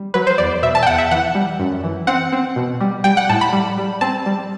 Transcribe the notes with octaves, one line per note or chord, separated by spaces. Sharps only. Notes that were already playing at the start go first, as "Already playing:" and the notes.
Already playing: G3
F#3 B4
C5
E2 D5
B2 E5
A5
G5
E2 F#5
E5
E3 F#5
G3
F#2
E3
C4 F#5
C4
B2
G3
G3 G5
F#5
A2 A5
B5
G3
G3
C4 A5
G3